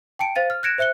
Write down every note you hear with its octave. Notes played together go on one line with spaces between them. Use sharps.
G5 A5 C#7 D7
C5 F5 A6 D#7
F6
F#6 G#6 A#6 C#7 D7 E7
C5 E5 F#6 C#7 G7